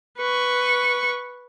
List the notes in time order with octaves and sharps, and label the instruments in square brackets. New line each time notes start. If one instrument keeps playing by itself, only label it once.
[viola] B4 C#6